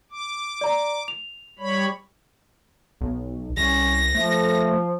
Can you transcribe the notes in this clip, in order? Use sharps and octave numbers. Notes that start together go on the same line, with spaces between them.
D6
D5 A#5
F7
G3 C#5 B5
B1
C2 C#4 A#6
F3 A3